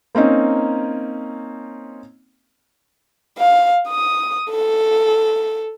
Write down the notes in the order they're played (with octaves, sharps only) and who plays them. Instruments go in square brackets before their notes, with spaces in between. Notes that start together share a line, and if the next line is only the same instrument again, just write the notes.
[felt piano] A#3 C4 C#4 D#4
[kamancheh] F5
D#6
A4